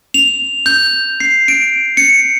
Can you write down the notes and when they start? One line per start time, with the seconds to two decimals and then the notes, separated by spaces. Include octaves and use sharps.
0.14 F7
0.66 G6
1.20 C7
1.48 D7
1.97 C#7